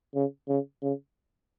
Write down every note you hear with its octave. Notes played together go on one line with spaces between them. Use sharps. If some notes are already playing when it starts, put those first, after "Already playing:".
C#3
C#3
C#3